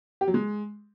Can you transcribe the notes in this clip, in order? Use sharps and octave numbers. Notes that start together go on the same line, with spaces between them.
G4
F#3
G#3